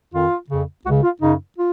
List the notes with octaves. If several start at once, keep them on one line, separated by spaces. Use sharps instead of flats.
F2 D#3 F4
F2 C#3
C#2 C#3 F#4
F4
F#2 C#3 D#4
F4